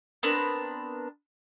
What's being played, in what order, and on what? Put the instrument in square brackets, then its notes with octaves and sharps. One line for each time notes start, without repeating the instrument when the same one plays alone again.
[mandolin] B3 C4 D4 A#4